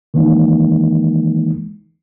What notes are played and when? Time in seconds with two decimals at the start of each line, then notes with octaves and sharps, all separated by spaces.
0.14 D#3 E3 G#3 A#3 D#4